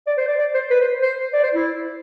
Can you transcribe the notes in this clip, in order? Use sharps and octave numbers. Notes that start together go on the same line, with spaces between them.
D5
C5
D5
D5
C5
B4
C5
C5
D5
C5
E4